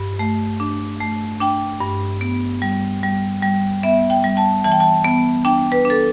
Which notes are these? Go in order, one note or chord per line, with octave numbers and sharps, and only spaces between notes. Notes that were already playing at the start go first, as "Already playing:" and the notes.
Already playing: G2
A3
D4
A3
D4 G5
G2
B3
G3
G3
G3
B3 E5
G5
G3
A5
E3 A5
G5
A5
B3
D4 G5
B4
D4 A4